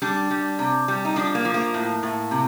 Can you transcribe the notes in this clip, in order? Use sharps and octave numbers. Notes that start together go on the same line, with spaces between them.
G3 D4
G3
C3
G3
D#4
F3 D4
A#3
F3
A#3
A2
A2
C3